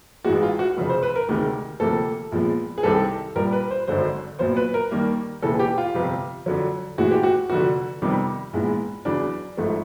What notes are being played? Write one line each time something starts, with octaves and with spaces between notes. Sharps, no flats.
A1 G#2 E3 G#3 F#4
F4
F#4
F1 F2 C#3
C5
B4
A#4
D2 C3 D#3 G#3
D2 C3 F3 A#3 A4
A#1 A#2 F3 G#3 B3
G#4
C2 C3 D#3 A4
A#1 A#2 G3 A#4
B4
C5
G#1 F#2 D3 F#3 C5
A#1 A#2 F#3 B3 C5
B4
A#4
D#2 D#3 G3 A#3
E1 D#2 C#3 E3 A4
G4
F4
G1 F2 C3
F2 D3 F#3
A#1 A2 E3 G#3 F#4
G4
F#4
F1 F2 D3 F#4
F2 C3 D#3 G3 B3
A#1 G#2 E3 G#3 B3
E2 C#3 F#3 D4
G#1 G#2 F3 A3